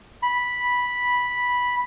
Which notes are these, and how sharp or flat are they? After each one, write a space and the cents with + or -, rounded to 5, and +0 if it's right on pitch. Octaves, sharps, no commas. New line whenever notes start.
B5 -5